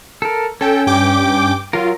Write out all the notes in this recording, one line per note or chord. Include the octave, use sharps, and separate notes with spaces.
A4 A#4
C#4 A4 G5
G2 G5 D6
F#3 F4 A#4